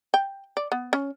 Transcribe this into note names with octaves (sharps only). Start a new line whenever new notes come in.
G5
D5
B3
C#4